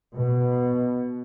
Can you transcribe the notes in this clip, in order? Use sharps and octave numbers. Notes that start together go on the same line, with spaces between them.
B2